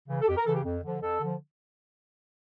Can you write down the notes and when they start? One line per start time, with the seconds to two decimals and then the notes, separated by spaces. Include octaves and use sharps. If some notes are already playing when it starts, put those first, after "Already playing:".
0.09 C#3 E3
0.22 A4
0.28 F2 G4
0.37 A#4
0.47 C#3 E3 A4
0.55 G4
0.64 F2
0.84 D3 F3
1.01 F2 A4
1.20 D3 F3